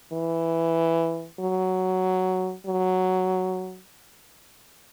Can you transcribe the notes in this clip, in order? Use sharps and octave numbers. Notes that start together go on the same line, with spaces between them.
E3
F#3
F#3